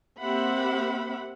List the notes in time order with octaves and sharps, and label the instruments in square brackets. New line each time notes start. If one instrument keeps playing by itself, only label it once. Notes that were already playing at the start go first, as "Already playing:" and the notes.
[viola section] A#3 C4 G4 E5 F#5 B5